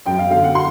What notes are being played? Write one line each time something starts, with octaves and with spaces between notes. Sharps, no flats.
F#2 G5
F5
D3 F5
F#5
C6